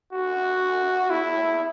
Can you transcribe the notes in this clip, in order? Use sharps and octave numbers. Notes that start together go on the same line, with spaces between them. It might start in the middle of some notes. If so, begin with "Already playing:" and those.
F#4
E4